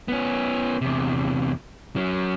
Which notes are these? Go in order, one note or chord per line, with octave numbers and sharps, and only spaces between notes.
B3 C#4
E2 C3
F#3 C#4